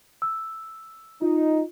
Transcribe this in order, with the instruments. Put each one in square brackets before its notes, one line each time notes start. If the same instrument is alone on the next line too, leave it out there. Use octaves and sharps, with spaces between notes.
[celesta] E6
[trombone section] D#4 [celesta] F4